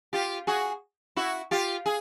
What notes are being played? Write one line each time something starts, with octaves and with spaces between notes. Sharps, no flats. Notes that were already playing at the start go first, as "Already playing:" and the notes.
F4 G4
F#4 G#4
E4 F#4
F4 G4
G#4